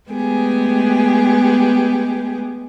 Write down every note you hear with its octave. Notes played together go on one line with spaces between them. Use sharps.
G#3 A3 B3 G4 G#4